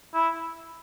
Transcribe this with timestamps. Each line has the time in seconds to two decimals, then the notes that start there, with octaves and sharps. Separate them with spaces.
0.14 E4